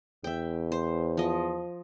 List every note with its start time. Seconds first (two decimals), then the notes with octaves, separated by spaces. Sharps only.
0.24 E2 E5 G5
0.72 C5
1.17 F3 D#5